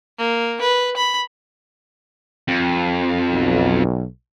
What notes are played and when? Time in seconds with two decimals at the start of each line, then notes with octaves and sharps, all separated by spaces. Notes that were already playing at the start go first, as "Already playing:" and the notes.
0.18 A#3
0.61 B4
0.97 B5
2.48 F2
3.30 B1